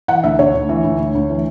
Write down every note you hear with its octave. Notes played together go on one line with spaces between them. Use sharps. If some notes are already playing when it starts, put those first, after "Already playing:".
E3 F#5
D2 E5
D2 C#5
D2
E3
D2
D2
D2
E3